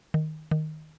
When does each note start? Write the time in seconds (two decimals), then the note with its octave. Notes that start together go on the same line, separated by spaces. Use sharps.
0.14 D#3
0.51 D#3